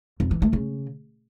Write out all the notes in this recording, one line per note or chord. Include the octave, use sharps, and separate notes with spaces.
F2
E3
A3
C#3